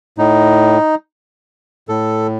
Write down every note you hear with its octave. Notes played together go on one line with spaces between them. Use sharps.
A2 D#4
A2 A4